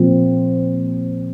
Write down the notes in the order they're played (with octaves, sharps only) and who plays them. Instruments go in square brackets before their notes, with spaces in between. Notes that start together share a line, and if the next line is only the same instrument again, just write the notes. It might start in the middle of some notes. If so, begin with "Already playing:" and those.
Already playing: [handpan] A#2 F3 C4